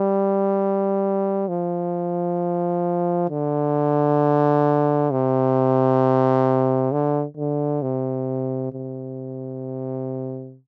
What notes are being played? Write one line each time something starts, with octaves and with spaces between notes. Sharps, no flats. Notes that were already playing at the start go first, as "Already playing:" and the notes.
Already playing: G3
F3
D3
C3
D3
D3
C3
C3